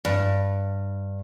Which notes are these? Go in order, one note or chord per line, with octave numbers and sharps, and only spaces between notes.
G2